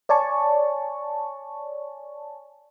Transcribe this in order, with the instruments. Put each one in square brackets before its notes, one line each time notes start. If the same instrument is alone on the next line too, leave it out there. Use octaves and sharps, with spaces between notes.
[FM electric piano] C#5 D5 G#5 A5 C#6